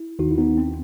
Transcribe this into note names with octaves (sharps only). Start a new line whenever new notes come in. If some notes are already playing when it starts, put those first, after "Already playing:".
Already playing: E4
D#2 D#3 D#4 F#4
E4
B3 D#4
C4